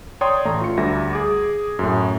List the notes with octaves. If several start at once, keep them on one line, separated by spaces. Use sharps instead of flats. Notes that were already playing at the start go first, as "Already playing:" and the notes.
C#5 D5 G5 A#5 C6 D#6
A1 A3 A#5
F4 C#7
D2 G3 E5 A#6
G#4 D6
F#2 A2